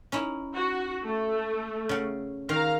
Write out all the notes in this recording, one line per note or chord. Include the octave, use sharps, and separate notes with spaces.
C#4 D#4 E4
F#4
A3
C#3 F#5
D#3 F5 A#5